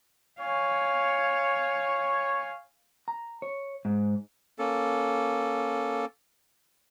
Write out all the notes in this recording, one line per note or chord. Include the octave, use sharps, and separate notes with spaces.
C#5 F5 G#5
A#5
C#5
G#2
A#3 C#4 A4